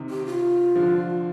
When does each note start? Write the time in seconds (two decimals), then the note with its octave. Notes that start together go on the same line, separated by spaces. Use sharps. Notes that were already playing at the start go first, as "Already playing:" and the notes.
Already playing: C3 D#3
0.10 G4
0.26 F4
0.75 D3 F3